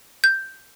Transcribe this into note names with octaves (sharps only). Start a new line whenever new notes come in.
G6